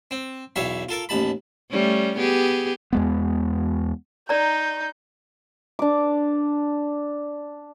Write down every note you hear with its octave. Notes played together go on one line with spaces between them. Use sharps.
C4
B1 E2 C#5 E5 F5
F4 A4 A#4
A1 D#2 A5 B5
G3 A3 C#4
B3 G4 G#4
E2 G#3 B3
D#4 D5 A#5 G6
D4 D6